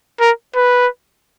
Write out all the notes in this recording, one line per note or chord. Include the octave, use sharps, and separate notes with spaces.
A#4
B4